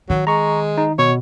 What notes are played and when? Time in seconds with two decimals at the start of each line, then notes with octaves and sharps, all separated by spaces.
0.10 D#3 F#3
0.27 G#3 A#5 C#6
0.78 D#4
0.99 B2 C#5